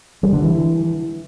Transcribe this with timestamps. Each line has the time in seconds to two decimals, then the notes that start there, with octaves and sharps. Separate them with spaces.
0.23 G3
0.33 D3
0.42 E3